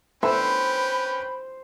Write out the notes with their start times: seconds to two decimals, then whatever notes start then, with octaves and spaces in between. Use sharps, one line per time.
0.23 B3 C#4 A4 B4 C5 E5 G5 B5